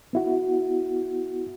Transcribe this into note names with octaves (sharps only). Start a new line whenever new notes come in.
B3 E4 F#4